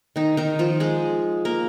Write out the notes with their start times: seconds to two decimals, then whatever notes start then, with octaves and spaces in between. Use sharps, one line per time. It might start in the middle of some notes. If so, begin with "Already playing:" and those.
0.16 D#3 D#4
0.37 D#3 D#4
0.59 F3 F4
0.80 G#3 G#4
1.45 A#3 A#4